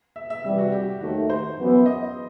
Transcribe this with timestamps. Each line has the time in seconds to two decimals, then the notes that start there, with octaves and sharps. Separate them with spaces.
0.16 E5
0.30 E5
0.44 C3 E3 G3 E5
0.58 F#4
0.72 G4
1.00 D#2 D#3 A3 F#4
1.30 C5
1.57 F#2 E3 B3 E4
1.86 D#5